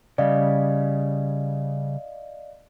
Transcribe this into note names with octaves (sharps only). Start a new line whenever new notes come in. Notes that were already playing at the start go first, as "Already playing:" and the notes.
C#3 G3 D5 D#5 F5